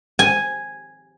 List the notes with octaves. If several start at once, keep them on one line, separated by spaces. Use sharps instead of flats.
G#5